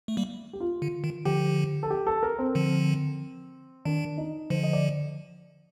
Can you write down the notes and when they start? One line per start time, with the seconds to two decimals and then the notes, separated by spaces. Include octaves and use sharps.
0.08 A3
0.17 G3 A#3
0.53 G4
0.60 F4
0.82 D3
1.04 D#3
1.25 D3 F3 G4
1.83 A4
1.90 G4
2.07 A4
2.23 A#4
2.39 C4
2.55 D3 F3
3.85 D#3 D4
4.18 D#4
4.50 D3 F3 C5
4.63 D#5
4.73 D5